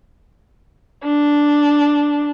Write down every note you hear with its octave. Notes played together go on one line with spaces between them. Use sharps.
D4